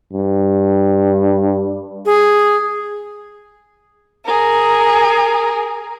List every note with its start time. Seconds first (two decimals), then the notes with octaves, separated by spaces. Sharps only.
0.13 G2
2.06 G#4
4.25 G#4 A#4